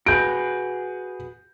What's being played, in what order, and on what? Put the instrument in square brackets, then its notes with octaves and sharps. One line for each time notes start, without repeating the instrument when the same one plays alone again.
[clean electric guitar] F#4 G#4 B4 [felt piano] G6 D7